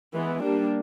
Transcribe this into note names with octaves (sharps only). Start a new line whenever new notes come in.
E3 G#3 B3
G3 A#3 D4